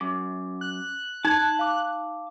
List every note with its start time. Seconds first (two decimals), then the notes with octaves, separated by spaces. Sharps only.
0.01 F#2 D6
0.61 F#6
1.25 D#4 A5 G#6
1.59 F5 D6